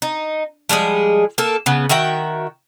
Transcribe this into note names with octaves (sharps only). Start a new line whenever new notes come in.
D#4
F3 G3 G#3 G#4
A#3 A4
C#3 B3
D#3 F#4 E5 G5